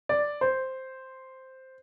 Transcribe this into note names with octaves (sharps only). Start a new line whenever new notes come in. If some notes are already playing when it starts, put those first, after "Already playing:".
D5
C5